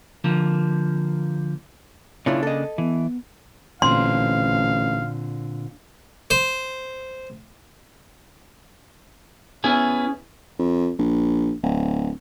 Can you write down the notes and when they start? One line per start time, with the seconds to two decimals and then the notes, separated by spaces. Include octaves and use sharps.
0.24 D3 F3 A#3
2.26 C#3 A#3 D4 E4 F4 C#5
2.43 A4 D#5
2.78 E3 B3
3.82 A1 A#2 D3 C4 F5 C6
6.30 C5
9.64 B3 C#4 E4 G#4
10.59 F2
10.99 A#1
11.63 D1